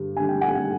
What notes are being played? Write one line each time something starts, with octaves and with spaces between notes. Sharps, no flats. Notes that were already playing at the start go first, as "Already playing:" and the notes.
Already playing: G2 D3 G3
G2 D3 G3 G#5
G5
F#5 G#5